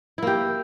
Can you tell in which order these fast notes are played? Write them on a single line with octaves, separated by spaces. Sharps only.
E4 A#3 G4